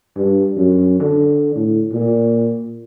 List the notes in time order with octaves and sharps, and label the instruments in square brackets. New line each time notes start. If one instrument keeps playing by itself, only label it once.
[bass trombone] G2
F#2
D3
A2
A#2